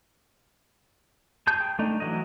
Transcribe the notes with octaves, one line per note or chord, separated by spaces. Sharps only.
G#4 A5 G6
G5
A3 D4 D#4
E3 F#3 D#5